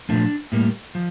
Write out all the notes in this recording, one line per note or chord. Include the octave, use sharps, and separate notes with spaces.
A#2 F3 A3 D4
A2 G3 A#3
F3